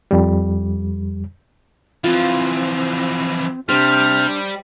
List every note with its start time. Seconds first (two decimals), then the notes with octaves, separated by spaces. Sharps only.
0.11 F2 G3
2.04 E3 F3 C4 F4
3.69 C3 G3 D4 C5 F6